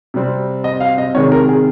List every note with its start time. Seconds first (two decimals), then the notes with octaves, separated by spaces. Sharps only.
0.14 C3 G3 C4
0.64 D#5
0.80 F5
0.98 D#5
1.15 C3 D#3 G#3 C#5
1.32 A#4
1.49 G#4